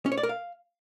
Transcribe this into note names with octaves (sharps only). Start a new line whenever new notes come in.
C#4
C#5
D5
A#4
F5